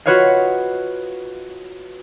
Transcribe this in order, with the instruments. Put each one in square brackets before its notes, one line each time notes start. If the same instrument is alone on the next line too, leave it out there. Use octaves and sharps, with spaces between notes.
[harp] F4 F#4 B4 C#5 D#5 F5